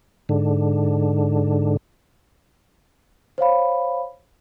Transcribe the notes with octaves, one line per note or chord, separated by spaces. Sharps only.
G#2 D3
C5 C#5 F5 B5